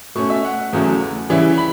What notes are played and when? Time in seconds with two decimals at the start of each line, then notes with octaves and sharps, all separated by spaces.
0.15 B2 A3 C#4 C#6
0.30 E5
0.45 F#5
0.73 E2 C#3 F#3 A3 C#4
1.30 C#3 E3 G3 C#4 E4
1.58 B5